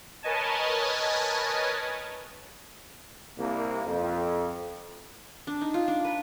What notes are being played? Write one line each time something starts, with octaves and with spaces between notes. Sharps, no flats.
A#4 B4 C#5 D#5 G#5 A5
C2 A#3
F2
D4
D#4
F4
D4
B4